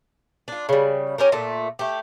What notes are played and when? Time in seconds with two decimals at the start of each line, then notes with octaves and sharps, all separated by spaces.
0.48 D4 F4
0.69 C#3 G3
1.18 C#4 G4 A#4
1.32 A#2 A3
1.79 A3 G4